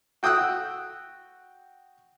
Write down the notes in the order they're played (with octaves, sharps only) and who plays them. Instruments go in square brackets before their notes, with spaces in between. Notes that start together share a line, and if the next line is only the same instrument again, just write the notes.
[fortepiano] F#4 G5 D#6 E6 F#6